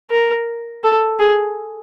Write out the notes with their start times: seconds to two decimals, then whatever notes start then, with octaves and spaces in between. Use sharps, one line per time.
0.10 A#4
0.83 A4
1.19 G#4